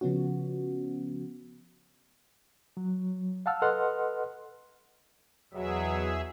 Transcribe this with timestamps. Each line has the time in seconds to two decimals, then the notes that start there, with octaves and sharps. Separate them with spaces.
0.01 C#3 F3 B3 C#4 F#4
2.77 F#3
3.46 F5 F#5 A5 E6 F6
3.62 A4 B4 D#5 F#5 C6 F6
5.53 E2 B2 F#3 G#4 E5